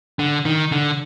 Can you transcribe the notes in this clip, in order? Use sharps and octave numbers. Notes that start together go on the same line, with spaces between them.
D3
D#3
D3